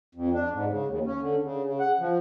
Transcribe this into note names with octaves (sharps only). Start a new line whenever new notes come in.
F2
D4
G#2
C#3
D#2
C#4
D3
C#3
C#3
F#5
F3